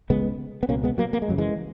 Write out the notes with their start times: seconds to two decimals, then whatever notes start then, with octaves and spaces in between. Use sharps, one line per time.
0.10 C#2 C#3 G#3 B3
0.63 B3
0.69 C#2 B2 A#3 C#4
0.84 G#3 B3
0.98 F#3 A#3
1.13 A#3
1.22 G#3
1.28 F#2 C#3 F#3
1.38 E3 G#3